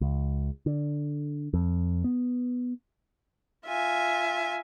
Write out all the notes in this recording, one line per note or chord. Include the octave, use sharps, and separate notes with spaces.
C#2
D3
F2
B3
F4 E5 G#5